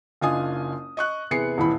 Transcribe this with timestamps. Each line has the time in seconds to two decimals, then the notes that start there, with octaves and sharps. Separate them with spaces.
0.21 F#1 D4 F4 D#5 G#5 D#6
0.97 D#5 C#6 F#6
1.31 E2 C3 B3 G#4 C7 C#7
1.58 D#1 E2 A2 E3 B5